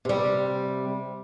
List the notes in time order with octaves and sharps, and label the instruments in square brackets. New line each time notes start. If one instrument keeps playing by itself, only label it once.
[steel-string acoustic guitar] C3 G3